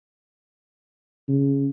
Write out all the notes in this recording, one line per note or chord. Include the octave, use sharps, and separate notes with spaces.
C#3